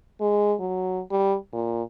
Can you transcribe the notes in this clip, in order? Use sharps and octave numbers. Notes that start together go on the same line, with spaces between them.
G#3
F#3
G3
A#2